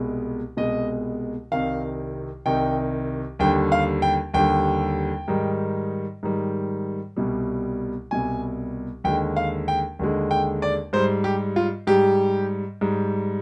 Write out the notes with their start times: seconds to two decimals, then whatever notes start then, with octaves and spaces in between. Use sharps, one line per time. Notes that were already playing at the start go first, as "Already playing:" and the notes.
Already playing: C2 B2 G#3
0.57 C2 B2 G#3 D#5
1.52 C2 C3 D#3 F5
2.46 C2 C3 D#3 G5
3.39 D#2 D3 G3 G5
3.72 F5
4.02 G5
4.34 D#2 D3 G3 G5
5.28 G#2 D#3 G3
6.23 G#2 D#3 G3
7.16 C2 B2 G3
8.11 C2 B2 G3 G#5
9.04 D#2 D3 G#3 G5
9.37 F5
9.68 G5
9.99 D#2 D3 G#3
10.31 G5
10.62 D5
10.93 G#2 G3 C5
11.24 G4
11.56 F4
11.87 G#2 G3 G4
12.81 G#2 G3